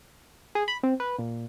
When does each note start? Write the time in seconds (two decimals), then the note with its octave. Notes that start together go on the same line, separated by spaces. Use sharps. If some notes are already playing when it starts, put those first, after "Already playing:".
0.55 G#4
0.68 B5
0.83 C4
1.00 B4
1.18 A#2